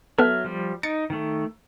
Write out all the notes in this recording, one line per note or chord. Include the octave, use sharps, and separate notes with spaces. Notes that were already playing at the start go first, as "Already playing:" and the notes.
F#3 B3 A4 E5 F6
F3 G3
D#4 A6 C#7 D7
D#3 A3